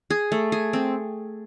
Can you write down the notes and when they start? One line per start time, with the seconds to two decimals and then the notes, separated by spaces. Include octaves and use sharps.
0.10 G#4
0.32 A3
0.52 G#4
0.73 C4